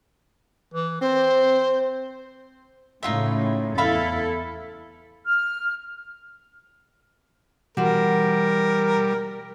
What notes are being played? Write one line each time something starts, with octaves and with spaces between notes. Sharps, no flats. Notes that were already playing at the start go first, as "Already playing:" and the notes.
E3
C4 C5
A2 C#3 D#4 F4 E5
E2 E4 A4 E5 F5 B5
F6
B2 E3 G3 F#4 A#4 C5